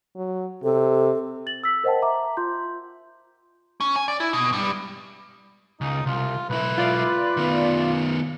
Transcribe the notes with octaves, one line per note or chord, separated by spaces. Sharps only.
F#3
C3 A4
A6 F#7
E6 B6
A#4 C5 D#5 F#5 G5 A5
E5 A#5 D6
F4 C6 G6
C#4
G#5
D5
E4
B2
G2
C#2 D#4
C2 F4
B1 E4 B4
F4 D5
D#3 B3